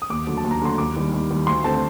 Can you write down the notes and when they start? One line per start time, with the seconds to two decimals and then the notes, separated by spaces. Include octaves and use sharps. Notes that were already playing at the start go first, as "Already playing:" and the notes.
0.02 D#6
0.10 D#2 D6
0.27 D3 F#3 A3
0.37 A5
0.44 D#2
0.51 A#5
0.62 D3 F#3 A3 C6
0.78 D#2 D6
0.96 D#3 G3
1.13 D#2
1.31 D#3 G3
1.47 D2 C6
1.64 D3 A3 C4 A5